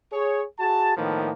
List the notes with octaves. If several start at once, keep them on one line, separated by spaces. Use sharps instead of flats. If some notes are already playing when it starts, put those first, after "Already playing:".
G#4 C#5
F#4 G#4 A5
A2 D#3 F3 A#3 B3